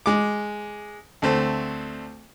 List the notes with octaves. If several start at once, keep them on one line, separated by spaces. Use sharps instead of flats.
G#3 D6
D2 A3 C4